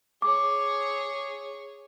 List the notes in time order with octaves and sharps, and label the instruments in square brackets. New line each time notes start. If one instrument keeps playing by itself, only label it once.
[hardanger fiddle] G#4 C#5 [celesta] D6